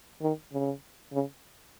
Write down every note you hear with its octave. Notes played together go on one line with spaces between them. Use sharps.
D#3
C#3
C#3